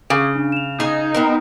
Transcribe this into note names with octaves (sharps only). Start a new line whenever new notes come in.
C#3 G#4 D6 D#6
D4
E7 F7
D#4 G#4 G#5
B3 C4 A#4